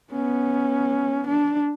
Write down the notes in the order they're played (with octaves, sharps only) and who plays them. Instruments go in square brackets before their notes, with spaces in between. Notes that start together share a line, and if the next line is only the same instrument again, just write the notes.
[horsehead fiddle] B3 C#4
D4